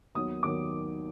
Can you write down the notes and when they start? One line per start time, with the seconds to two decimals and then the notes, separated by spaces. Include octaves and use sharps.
0.15 D#2 D#3 F#3 B3 D#6
0.43 D#2 D#3 F#3 B3 D6